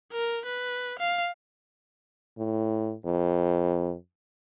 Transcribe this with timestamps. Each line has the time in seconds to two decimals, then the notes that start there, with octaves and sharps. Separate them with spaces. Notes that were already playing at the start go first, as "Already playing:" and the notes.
0.12 A#4
0.45 B4
0.99 F5
2.38 A2
3.05 F2